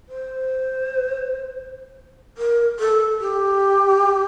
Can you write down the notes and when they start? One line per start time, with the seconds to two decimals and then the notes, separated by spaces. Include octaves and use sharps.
0.09 C5
2.38 A#4
2.79 A4
3.20 G4